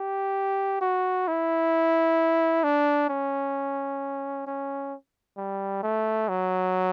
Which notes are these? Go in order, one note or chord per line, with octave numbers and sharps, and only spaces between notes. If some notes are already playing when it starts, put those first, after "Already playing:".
Already playing: G4
F#4
E4
D4
C#4
C#4
G3
A3
F#3